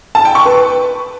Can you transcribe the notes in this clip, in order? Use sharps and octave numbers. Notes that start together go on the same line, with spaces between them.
A5
G5
C#6
B4